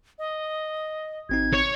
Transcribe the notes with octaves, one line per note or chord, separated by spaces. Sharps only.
D#5
G#1 C4 D#4 G#6
C#5